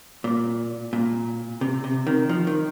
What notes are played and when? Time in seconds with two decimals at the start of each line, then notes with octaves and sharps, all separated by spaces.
0.24 A#2
0.93 A#2
1.61 C3
1.84 C3
2.07 D#3
2.29 F3
2.47 D#3